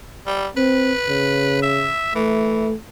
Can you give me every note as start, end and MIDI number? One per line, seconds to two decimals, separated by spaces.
0.27 0.48 55
0.57 0.93 60
0.57 1.62 71
1.09 1.89 49
1.62 2.12 76
2.15 2.69 52
2.15 2.74 57